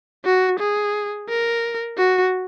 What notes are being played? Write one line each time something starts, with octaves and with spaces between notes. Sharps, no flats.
F#4
G#4
A#4
F#4